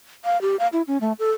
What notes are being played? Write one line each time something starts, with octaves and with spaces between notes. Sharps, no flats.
F5
G4
F5
E4
C#4
A3
A4